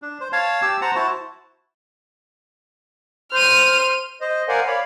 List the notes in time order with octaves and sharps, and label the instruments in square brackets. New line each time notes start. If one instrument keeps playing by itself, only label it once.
[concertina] D4
C5
C#5 F5 A5
G4 A5 E6
C5 F#5 A5 A#5
E4 F#4 C5 A5
[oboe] C5 [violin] F6 D#7
[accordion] C5 D#5
A#4 C5 D5 F5 F#5 G#5
C#5 D5 F5 B5